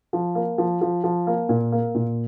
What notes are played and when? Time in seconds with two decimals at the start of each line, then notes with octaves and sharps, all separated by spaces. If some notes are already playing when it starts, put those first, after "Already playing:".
0.13 F3
0.35 A#3
0.58 F3
0.81 F3
1.04 F3
1.27 A#3
1.49 A#2
1.72 A#3
1.95 A#2